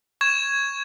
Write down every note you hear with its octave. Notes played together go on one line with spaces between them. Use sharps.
C#6 G#6 E7